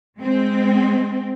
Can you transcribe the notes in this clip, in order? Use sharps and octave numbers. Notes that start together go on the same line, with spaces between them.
G#3 C4